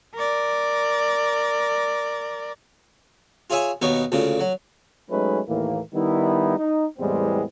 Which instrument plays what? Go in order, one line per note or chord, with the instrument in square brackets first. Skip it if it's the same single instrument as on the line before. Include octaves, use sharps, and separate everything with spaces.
[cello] A#4 D5
[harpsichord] F4 G#4 C#5 E5 G#5 C#6
D#2 B2 B3 D#4 C#5 C#6
D2 A#2 C#3
F#3
[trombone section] F#3 G#3 A3 C#4 D#4 B4
D#2 A2 E3 A#3
D#3 G3 B3 D#4 E4
D#4
E2 A2 G3 G#3 B3 C4